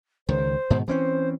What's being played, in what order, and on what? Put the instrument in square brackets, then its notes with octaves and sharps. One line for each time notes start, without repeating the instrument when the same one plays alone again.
[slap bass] C#2 D#3 [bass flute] C5
[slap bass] G#2 B2 D#3
[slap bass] E3 C4 C#4 [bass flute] C5